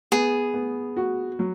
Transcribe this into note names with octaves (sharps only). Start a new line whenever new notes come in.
B3 G#4
B3
F#4
F#3